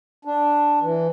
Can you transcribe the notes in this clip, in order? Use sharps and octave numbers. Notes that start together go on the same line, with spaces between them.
D4
E3